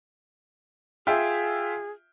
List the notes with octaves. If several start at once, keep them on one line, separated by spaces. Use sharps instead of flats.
F4 G#4 E5 G5